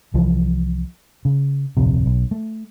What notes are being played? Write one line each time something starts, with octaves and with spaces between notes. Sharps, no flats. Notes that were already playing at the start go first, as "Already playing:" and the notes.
C2 E3 F3
C#3
D1 A#1 F2 C3
B1
A3